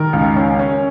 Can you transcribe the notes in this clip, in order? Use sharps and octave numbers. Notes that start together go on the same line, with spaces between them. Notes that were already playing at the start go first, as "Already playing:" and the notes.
Already playing: D#3 A#4
C#2
C#4
C#4